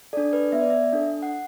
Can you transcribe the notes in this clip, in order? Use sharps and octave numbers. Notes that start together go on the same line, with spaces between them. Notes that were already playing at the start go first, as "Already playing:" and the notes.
D4 A4 D5
B4
B3 E5
D5
E5
D4 A4
F#5